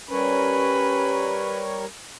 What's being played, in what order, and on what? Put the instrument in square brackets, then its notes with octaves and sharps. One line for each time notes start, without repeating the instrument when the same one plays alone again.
[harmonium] G3 A#4 C#5 [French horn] C#4 [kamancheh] B4